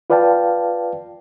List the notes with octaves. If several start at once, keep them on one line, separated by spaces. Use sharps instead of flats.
F4 B4 D5 F5 G5 A5